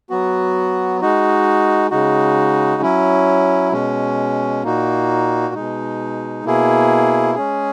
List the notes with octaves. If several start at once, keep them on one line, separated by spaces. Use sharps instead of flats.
F#3 B3 F#4
G#3 D#4 F#4
C#3 G#3 D#4 F#4
F#3 C#4 E4
B2 G#3 C#4
A#2 A#3 D#4 F#4
B2 G#3 D#4
B2 A#3 E4 G#4
G#3 C#4 G#4